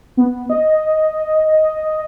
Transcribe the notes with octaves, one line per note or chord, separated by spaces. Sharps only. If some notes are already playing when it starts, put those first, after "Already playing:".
B3
D#5